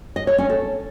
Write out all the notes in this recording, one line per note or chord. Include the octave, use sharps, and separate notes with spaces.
D#5
C#5
C#4
A4